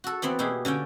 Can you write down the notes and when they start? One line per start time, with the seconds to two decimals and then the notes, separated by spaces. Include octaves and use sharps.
0.04 F#4 A4
0.22 E3 B3 C4 D5
0.39 B2 A#3 E4 G4 G#4
0.65 D3 C#4 D5 G5